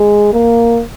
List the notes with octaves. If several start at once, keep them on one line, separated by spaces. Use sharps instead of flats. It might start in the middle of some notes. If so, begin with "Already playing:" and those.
Already playing: G#3
A#3